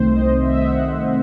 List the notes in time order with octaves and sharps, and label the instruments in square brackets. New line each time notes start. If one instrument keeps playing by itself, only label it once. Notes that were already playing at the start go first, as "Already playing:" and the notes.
Already playing: [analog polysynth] C2 C3 D#3 A3 C4 C5
C5
D#5
E5
D#5
E5
F#5